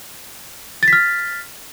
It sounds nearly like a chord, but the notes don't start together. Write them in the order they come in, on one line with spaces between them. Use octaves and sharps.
A6 B6 F6